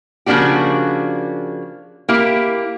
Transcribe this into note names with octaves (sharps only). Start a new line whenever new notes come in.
C#3 F3 A#3 D4 F#4 G4
A#3 E4 G4